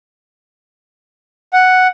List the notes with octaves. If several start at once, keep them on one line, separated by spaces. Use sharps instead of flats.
F#5